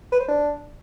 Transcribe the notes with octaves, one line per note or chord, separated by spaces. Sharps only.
B4
C5
D4